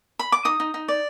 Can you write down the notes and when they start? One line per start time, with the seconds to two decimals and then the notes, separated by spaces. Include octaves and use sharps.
0.19 B5
0.32 D6
0.45 D#4 D#6
0.60 D#4
0.74 D#4
0.88 D5